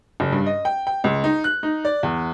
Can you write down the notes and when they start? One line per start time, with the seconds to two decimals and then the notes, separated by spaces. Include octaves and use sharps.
0.20 F#1
0.32 G2
0.46 D#5
0.65 G5
0.87 G5
1.04 C#2
1.24 D#4
1.44 F#6
1.63 D#4
1.85 D5
2.03 E2